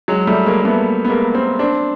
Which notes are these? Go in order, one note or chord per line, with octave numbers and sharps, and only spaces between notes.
F#3 G#3
G3 A3
G#3 A#3
A#3
A3 B3
B3
G#3 A#3
A#3 C4
C4 D4